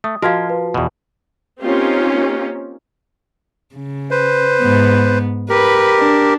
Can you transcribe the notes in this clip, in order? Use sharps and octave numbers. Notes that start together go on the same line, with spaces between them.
A3 D#6
F3 F#4 A#4 D#5 F5 F6 G#6
B4
E2 B2
A#3 C4 C#4 D#4 F4 G4
C#3
B4 C5
G#2 B3
G4 A#4 B4
D4